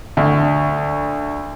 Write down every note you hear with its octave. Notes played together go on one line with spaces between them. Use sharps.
D2